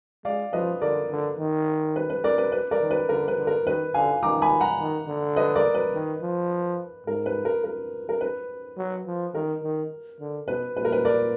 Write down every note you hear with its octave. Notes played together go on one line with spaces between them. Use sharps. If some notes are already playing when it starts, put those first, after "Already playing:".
G#3 D5 F5
F3 B4 D#5
D3 A#4 D5
D3
D#3
B4
B4
A#4 D5
B4
B4
A#4 D5
D#3
B4
D3 A#4
B4
D3
A#4
D#3 B4
D3 F5 G#5
D#3 A#5 D6
G#5 B5
F#5 A#5
D#3
D3
B4 D#5
A#4 D5
B4
D#3
F3
G#2 A#4
B4
A#4
A#4
A#4
B4
F#3
F3
D#3 A#4
D#3
D3
B2 B4
A#2 B4
A#4
B4
A#4 D5